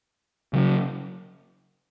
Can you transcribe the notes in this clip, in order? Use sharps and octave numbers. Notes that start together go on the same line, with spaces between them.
C#3 F#3 C#4